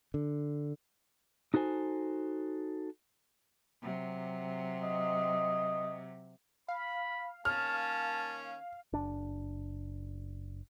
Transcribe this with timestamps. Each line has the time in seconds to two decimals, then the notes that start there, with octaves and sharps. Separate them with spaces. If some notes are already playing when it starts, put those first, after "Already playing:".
0.14 D3
1.54 D#4 F#4 A4 C5 G#5
3.82 C3 F#3
4.83 D#5
6.68 F5 B5
7.45 D#3 A#3 C#4 A5 F6
8.93 F#1 D4